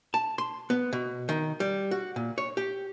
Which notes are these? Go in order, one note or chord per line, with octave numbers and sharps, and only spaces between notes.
A5
C6
B3
B2
D#3
G3
F#4
A#2
C#5
G4